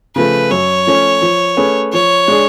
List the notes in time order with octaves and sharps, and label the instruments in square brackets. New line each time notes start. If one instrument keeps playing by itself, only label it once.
[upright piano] C#3 F3 A3 [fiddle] B4
[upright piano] F#2 [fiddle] C#5
[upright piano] F3 A3 C#4
F3
A3 C#4 G#4 B4
[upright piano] F3 [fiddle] C#5
[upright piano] G#3 D4 G#4